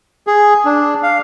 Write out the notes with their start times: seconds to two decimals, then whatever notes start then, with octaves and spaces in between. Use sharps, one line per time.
0.27 G#4
0.65 D4
1.03 F5